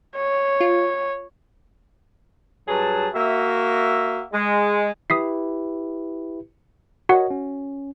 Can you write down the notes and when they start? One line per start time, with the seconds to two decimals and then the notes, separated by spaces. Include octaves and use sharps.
0.16 C#5
0.60 F4
2.68 G2 F#3 G#4 B4 A5
3.15 A#3 F#4 E5
4.33 G#3
5.10 E4 G4 B4 D#6 B6 C7
7.09 F#4 A#4 C#5 D#5 F#5
7.30 C#4